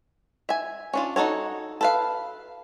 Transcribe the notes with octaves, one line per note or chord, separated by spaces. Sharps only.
E5 G#5
C#4 D4 F4
D#4 F#4 A4 C#5
A4 B4 F5